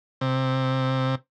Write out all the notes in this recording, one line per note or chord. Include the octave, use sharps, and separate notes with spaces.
C3